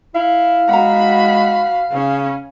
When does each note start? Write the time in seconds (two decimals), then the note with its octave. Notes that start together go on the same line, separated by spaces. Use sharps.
0.15 E4 F5
0.69 G#3 F#4 F#5 A#5 B5
1.92 C#3 C#4